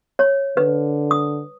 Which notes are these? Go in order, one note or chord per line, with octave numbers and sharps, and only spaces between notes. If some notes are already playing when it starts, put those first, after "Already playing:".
C#5
D3 B4
D#6